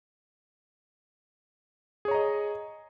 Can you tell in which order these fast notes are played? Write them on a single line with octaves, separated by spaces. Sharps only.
G#4 C#5 A#5 D#5